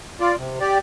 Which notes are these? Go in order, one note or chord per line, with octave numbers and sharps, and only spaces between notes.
F4 D5
C3
G4 D5